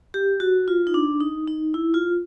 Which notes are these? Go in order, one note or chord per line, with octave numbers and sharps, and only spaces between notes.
G4
F#4
F4
D#4
D4
D#4
D#4
E4
F4